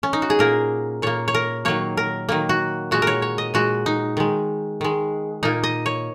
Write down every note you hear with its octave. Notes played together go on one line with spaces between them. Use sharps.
C#4
D#4
F#4
G#4
A#2 A#3 A#4
A#2 A#3 C#5
C#5
A#4
D#3 F#3 A#3 C#5
A#4
D#3 F#3 A#3
F#4
A#2 G#3 F#4
A#4 C#5
C#5
D#5
A#2 G#3 F#4
D#4
D#3 G#3
D#3 G#3
A#2 A#3 D#4
D#5
C#5